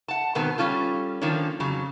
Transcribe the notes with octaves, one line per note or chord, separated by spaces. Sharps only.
F#5 A5
G#2 B2 D#3 B3 C4
G3 C#4 F4 A4
D#3 F3 A#3 C#4 D4
F2 C#3 F#3